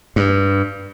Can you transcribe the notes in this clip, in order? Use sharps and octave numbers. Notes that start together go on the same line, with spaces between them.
G2